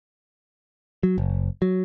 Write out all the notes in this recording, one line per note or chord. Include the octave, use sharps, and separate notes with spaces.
F#3
F#1
F#3